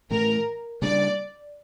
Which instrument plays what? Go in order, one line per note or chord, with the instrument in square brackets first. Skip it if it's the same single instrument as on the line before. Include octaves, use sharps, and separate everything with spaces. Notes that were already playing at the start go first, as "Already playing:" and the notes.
[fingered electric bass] A2 E3 A3 [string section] A#4
[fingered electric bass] C#3 G3 A#3 D4 [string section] D5